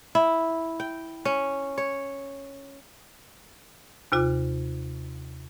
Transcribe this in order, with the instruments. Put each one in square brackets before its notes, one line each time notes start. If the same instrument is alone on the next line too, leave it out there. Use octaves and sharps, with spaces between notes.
[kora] E4
G5
C#4
C#5
[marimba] D#2 C3 F4 D6